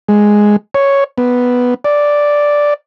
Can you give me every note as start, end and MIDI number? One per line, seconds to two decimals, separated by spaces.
0.08 0.56 56
0.75 1.04 73
1.18 1.74 59
1.84 2.74 74